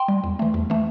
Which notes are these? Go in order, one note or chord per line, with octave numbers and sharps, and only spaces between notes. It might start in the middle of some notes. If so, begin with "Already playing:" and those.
Already playing: G5 C6
G3
E2
E3 A3
E2
E3 A3